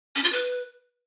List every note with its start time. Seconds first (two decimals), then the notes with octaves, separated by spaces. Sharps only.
0.16 C#4
0.24 F4
0.32 B4